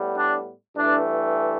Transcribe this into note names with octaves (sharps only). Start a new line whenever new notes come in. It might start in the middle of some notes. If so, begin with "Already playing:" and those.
Already playing: A2 G3 B3
D4
G2 E3 A3 D4